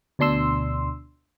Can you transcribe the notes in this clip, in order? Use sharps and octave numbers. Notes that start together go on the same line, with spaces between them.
D2 B2 D4 C6 E6